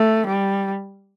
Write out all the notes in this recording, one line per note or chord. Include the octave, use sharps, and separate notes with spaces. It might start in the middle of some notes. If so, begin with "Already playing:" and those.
Already playing: A3
G3